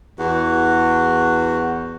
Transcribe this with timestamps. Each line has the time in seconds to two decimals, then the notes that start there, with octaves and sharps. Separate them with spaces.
0.19 E2 F#4